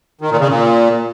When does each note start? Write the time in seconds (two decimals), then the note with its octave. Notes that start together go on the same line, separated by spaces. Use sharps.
0.21 D#3
0.30 A#2
0.40 C#3
0.49 A#2